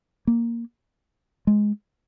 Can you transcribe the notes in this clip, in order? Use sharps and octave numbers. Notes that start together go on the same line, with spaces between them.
A#3
G#3